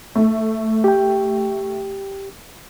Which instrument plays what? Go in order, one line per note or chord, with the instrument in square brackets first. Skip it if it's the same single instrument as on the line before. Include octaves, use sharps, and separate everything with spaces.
[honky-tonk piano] A3
[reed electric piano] G4 G5